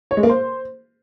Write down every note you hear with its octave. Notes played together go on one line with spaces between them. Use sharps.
C#5
G#3
A#3
C5